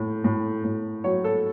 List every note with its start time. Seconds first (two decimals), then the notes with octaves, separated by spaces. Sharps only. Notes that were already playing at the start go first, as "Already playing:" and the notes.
Already playing: A2
0.24 A2
0.64 A2
1.04 F#3 C#5
1.24 A4